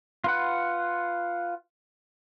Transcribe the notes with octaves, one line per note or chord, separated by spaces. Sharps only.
F4 B4 F#5